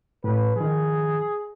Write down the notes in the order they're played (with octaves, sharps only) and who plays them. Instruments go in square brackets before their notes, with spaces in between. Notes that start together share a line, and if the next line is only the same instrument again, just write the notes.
[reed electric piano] A2 [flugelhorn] B4
[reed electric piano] D#3 F3 [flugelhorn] G#4